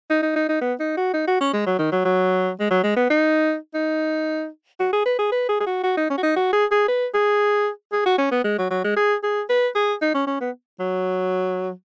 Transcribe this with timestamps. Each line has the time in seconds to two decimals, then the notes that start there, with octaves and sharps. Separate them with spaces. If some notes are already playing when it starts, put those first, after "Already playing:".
0.10 D#4
0.22 D#4
0.36 D#4
0.49 D#4
0.61 B3
0.80 D#4
0.97 F#4
1.13 D#4
1.27 F#4
1.41 C#4
1.53 G#3
1.66 F#3
1.79 D#3
1.92 F#3
2.05 F#3
2.60 G#3
2.71 F#3
2.83 G#3
2.96 B3
3.10 D#4
3.74 D#4
4.80 F#4
4.93 G#4
5.05 B4
5.19 G#4
5.32 B4
5.49 G#4
5.60 G#4
5.66 F#4
5.83 F#4
5.97 D#4
6.10 C#4
6.17 F#4
6.23 D#4
6.36 F#4
6.53 G#4
6.71 G#4
6.88 B4
7.14 G#4
7.93 G#4
8.06 F#4
8.18 C#4
8.31 B3
8.44 G#3
8.58 F#3
8.70 F#3
8.84 G#3
8.96 G#4
9.23 G#4
9.50 B4
9.75 G#4
10.02 D#4
10.14 C#4
10.27 C#4
10.41 B3
10.80 F#3